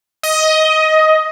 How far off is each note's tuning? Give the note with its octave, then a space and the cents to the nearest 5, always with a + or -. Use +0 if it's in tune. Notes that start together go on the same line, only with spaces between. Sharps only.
D#5 +10